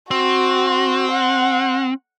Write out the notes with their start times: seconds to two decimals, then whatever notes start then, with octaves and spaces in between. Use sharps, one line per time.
0.11 C4 F#4
1.11 F#5